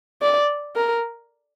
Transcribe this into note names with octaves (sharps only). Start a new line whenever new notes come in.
D5
A#4